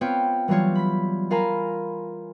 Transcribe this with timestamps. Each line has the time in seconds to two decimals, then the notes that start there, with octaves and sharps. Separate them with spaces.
0.01 B3 C4 F4 C#5 F5 G5
0.48 E3 F#3 G3 F4 C#5
0.75 B5 B6
1.30 F4 A#4 F5 G#5 A#5 B5